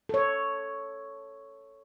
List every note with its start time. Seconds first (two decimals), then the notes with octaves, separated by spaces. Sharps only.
0.09 A4 C#5